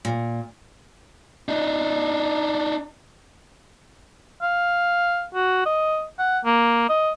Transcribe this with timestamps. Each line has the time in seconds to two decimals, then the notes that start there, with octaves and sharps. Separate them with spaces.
0.05 A#2
1.49 D4 D#4
4.42 F5
5.34 F#4
5.66 D#5
6.19 F#5
6.45 A#3
6.89 D#5